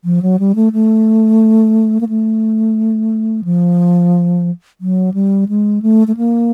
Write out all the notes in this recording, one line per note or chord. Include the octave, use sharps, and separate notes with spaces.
F3
F#3
G3
A3
A3
A#3
A3
F3
F#3
G3
G#3
A3
A3
A#3